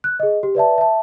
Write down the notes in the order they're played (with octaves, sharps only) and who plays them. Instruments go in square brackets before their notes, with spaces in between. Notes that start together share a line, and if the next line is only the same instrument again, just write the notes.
[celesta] F#6
G#4 D#5
G4
B4 D5 E5 A5
E5 A5